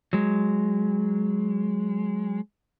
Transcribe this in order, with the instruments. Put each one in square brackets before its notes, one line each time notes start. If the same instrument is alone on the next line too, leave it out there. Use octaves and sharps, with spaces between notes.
[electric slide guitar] F#3 G#3